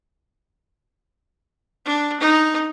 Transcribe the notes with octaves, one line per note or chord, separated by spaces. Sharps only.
D4
D#4